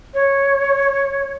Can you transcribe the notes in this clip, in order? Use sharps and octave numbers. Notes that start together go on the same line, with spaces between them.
C#5